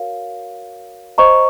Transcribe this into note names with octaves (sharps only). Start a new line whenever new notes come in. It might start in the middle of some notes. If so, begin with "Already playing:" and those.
Already playing: F#4 A#4 C#5 F5
C5 D#5 A#5 C#6